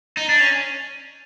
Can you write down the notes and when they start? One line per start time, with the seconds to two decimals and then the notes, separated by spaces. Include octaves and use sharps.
0.17 D#4
0.29 D4
0.40 C#4